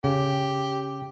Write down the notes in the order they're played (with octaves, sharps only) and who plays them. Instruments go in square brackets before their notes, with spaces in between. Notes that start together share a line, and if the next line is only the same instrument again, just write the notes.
[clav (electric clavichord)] C#3 [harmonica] G4